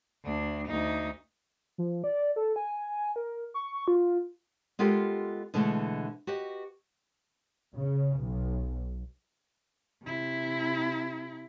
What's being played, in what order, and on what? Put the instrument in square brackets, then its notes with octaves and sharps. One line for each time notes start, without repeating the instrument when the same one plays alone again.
[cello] D2 D4
D2 D#4
[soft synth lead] F3
D5
A4
G#5
A#4
C#6
F4
[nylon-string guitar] G#3 B3 F4 G4 A4 A#4
B2 D3 E3 G#3 A3
F#4 G4 B4 D#5
[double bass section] C#3
B1
[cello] C3 E4